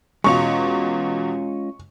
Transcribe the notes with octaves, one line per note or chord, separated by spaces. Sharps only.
E2 B2 G#3 C#4 F4 C#6 F7